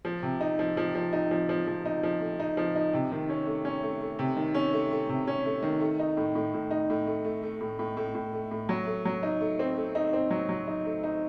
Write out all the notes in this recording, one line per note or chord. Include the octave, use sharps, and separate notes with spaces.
F3
C3
D#4
F3
F3
F3
D#4
F3
F3
F3
D#4
F3
A3
D#4
F3
D#4
C3
D#3
C#4
A3
C#4
A3
A3
C3
D#3
C#4
A3
A3
C3
C#4
A3
D#3
A3
D#4
A2
A2
A2
D#4
A2
A3
A3
A3
A2
A2
A2
A2
A3
A2
F#3
A3
F#3
D#4
A3
C4
A3
D#4
C4
F#3
F#3
D#4
A3
D#4